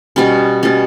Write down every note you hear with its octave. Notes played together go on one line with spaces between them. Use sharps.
B2 G3 C#4
B2 G3 C#4